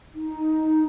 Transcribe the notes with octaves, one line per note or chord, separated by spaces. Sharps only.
D#4